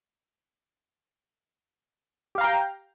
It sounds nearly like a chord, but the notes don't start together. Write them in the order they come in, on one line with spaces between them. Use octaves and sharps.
G4 F5 A#5 G5